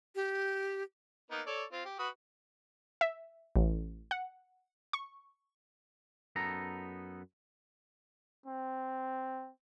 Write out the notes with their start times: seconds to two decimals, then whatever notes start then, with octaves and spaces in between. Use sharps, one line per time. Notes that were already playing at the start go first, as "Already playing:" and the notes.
0.15 G4
1.31 A#3 B3 D#4
1.47 A4 C#5 D5
1.72 C4 F4
1.85 G4
1.99 F#4 B4 D#6
3.01 E5
3.56 A1
4.11 F#5
4.93 C#6
6.36 F#2 B3 D#4 A4 A#5
8.46 C4